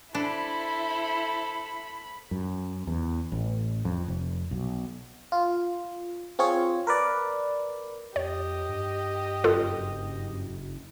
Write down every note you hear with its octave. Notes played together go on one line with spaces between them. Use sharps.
D4 E4 A4 C5 B5
F#2
E2
A1
F2
F1
B1
F4
C4 F4 G#4 C#5
A#4 B4 D5
F2 G4 C#5 D#5
G2
F#1 F4 A4